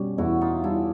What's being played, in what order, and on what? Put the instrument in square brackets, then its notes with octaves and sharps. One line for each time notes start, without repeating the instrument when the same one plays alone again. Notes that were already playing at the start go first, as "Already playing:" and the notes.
Already playing: [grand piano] B2 G3 [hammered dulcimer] C#4
[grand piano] E2 [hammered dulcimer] E4 F#4
[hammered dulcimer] D#4 F4
[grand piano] G3 [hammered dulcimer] D4 E4